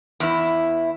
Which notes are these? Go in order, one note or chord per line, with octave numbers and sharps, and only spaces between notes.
E2 E4